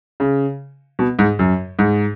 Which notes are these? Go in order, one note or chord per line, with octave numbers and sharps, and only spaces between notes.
C#3
B2
G#2
F#2
G#2